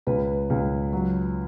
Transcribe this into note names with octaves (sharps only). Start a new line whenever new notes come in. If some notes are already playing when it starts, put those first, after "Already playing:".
C#2 B4
C#2
F#3